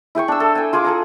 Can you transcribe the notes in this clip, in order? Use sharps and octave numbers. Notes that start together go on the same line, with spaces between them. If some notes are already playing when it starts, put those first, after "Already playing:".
E4 G#4 G5 C#6
D4 E6
A4
G5 G#5
F4 G#4 C6 D6
G#4 A4 A#5